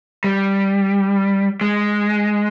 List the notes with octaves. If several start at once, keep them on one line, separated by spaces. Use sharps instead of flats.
G3
G#3